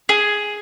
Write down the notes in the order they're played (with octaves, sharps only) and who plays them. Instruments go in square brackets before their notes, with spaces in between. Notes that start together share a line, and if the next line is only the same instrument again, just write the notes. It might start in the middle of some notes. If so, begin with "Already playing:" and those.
[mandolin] G#4